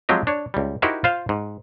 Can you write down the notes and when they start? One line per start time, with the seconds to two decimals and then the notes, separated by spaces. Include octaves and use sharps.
0.09 F3 F#3 G#3 C4 G4 D#5
0.27 D4 C#5
0.54 C#2 G3
0.82 D#4 E4 F#4 G4 A#4 C5
1.04 F4 C5 F5
1.29 G#2